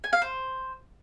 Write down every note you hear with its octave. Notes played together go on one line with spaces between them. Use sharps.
G#5
F5
C5